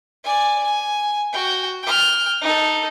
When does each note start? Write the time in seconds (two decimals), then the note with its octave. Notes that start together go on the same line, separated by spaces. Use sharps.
0.24 D5 G#5
0.64 G#5
1.33 F#4 G5
1.83 G5 F6
2.41 D#4 A4